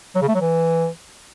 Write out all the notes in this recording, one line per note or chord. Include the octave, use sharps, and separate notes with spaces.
F#3
C#3
A3
F#3
E3